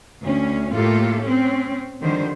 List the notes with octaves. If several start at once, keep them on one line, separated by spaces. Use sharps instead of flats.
D2 C#4
A2 A#3 F4 G4 A4
C4 C#4
D3 D#3 F3 G3 C5